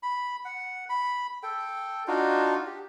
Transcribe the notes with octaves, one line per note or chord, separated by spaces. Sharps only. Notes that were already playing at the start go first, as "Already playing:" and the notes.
B5
F#5
B5
A4 G5
D4 D#4 F4 F#4
G4